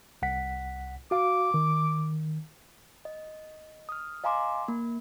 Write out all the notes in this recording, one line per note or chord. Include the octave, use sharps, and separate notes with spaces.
C2 F#5 B6
F#4 F5 D6
D#3
D#5
D#6 F6
D#5 F5 G#5 A#5 C6 D6
A#3